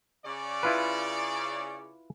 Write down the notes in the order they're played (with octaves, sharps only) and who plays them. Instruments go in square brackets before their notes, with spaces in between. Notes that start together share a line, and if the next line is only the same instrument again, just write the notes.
[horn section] C#3 D5
[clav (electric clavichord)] E4 F4 B4